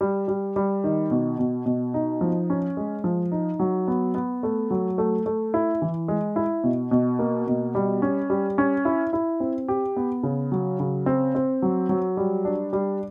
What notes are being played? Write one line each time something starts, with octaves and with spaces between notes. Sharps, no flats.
G3
G3
G3
D#3
B2
B2
B2
D#4
F3
C#4
G#3
F3
D#4
F#3
B3
B3
A3
F#3
A3
A3
E4
E3
G#3
E4
B2
B2
A#3
B2
G3
C#4
G3
C#4
E4
E4
C4
G4
B3
C#3
F#3
C#3
C4
C4
F#3
F#3
G3
D4
G3